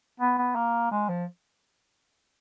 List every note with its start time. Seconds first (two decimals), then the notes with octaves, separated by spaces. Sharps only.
0.20 B3
0.38 B3
0.56 A#3
0.92 G#3
1.09 F3